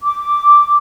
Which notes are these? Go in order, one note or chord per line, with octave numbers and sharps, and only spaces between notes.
D6